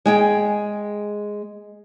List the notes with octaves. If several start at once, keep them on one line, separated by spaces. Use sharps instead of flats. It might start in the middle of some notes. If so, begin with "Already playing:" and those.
G#3 G#4 G5